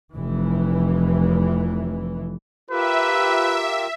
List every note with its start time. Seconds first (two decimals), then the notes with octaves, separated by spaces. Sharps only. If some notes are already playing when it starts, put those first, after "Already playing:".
0.15 F1 E3
2.70 F4 G4 A#4 B4 E5